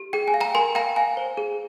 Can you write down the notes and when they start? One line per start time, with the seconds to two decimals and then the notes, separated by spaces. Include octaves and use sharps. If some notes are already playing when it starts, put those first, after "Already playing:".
Already playing: G4
0.13 G#4 G5
0.28 G#5
0.34 F5
0.41 G5 A#5
0.55 A#4 G#5 C6
0.75 F5 G5 A#5
0.96 F5 G#5
1.17 C5
1.37 G#4